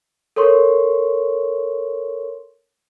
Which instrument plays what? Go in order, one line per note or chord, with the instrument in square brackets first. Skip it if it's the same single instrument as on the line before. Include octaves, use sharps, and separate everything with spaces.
[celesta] A4 A#4 C#5 C6 C#6